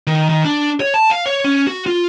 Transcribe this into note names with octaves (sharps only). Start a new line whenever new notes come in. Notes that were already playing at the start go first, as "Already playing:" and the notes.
D#3
D#3
D4
C#5
A5
F5
C#5
C#4
F#4
F4